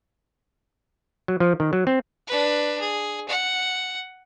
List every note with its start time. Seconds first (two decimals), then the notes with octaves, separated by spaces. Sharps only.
1.28 F#3
1.40 F3
1.60 D#3
1.73 F#3
1.87 C4
2.27 D4 B4
2.81 G#4
3.28 F#5